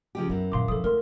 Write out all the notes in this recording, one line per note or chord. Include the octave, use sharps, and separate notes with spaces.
C#3 F3 G4
F#2 E3 B3
A#2 D#3 F5 C6 D6
F3 E4 A4 D#6
D2 E4 A#4 C6